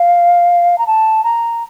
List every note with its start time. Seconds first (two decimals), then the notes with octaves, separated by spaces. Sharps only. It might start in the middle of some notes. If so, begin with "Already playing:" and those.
Already playing: F5
0.78 A#5
0.87 A5
1.24 A#5